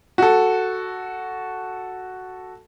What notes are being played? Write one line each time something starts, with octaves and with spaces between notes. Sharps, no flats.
F#4 A4